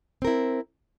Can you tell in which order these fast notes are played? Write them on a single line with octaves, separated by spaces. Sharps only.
C4 A#4 E4